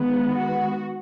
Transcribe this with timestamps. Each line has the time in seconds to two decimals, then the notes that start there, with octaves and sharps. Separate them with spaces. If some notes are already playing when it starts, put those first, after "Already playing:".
Already playing: D#3 G#3 B3
0.31 F#4